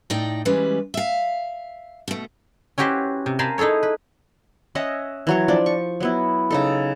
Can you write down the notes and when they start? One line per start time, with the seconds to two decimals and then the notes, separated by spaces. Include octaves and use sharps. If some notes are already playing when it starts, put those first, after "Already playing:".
0.10 A2 D#4 D5 D#5 G5
0.45 E3 G3 G#3 C#4 B4
0.94 E5 F5
2.08 B2 A3
2.78 C#4 E4 F#4 G4 B4 C5
3.26 C3
3.39 A#4 C5 F5 G#5 A5 B5
3.58 D#4 E4 G#4 A4 C#5
3.83 B4
4.75 C#4 D#5 E5 F#5
5.27 E3 F#3 C#5
5.48 F3 D4 D5
5.66 C#6
6.00 F#3 B3 E4
6.51 C#3 D#4 A4